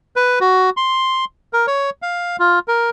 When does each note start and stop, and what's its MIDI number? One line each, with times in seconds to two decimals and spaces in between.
0.16 0.39 71
0.41 0.70 66
0.77 1.25 84
1.53 1.66 70
1.67 1.90 73
2.02 2.36 77
2.39 2.59 65
2.68 2.90 70